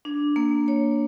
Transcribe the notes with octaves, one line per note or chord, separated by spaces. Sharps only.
D4
A#3
C#5